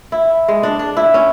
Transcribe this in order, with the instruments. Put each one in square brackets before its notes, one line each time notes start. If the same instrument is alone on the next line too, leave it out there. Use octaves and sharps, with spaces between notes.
[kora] E4
G#3
D4
D4
E4
C#4